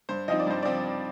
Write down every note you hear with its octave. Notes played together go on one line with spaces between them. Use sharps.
G2 C5
F3 C4 D#4 D#5
D5
G2 C5
F3 C4 D5